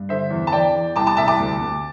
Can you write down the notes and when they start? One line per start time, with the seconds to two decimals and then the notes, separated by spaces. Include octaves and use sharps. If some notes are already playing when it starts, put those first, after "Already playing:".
Already playing: G2
0.09 D3 C5 E5
0.30 E2
0.47 A5
0.53 E2 D5 G5
0.75 E2
0.96 C2 A5 D6
1.07 A5 D6
1.17 C2 E5 A5
1.28 A5 D6
1.39 D2
1.61 D2